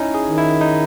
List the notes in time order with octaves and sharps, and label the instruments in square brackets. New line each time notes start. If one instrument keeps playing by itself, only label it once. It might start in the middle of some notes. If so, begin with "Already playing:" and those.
Already playing: [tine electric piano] C#4 D#4 E4
G#4
[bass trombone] D#3
[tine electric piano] E4
D#4